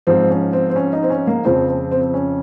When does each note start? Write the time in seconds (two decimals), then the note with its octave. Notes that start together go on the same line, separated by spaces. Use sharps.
0.07 G#2 F3 C4
0.30 C#4
0.53 C4
0.70 C4
0.76 C#4
0.93 D#4
1.03 C4
1.10 C#4
1.27 A#3
1.45 F2 C#3 F3 C4
1.68 C4
1.91 C4
2.02 C4
2.14 C#4